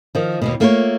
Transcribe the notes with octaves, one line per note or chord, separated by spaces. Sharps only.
D#3 F3
D#2 G#2 B2
A3 A#3 F4 A#4 C5 C#5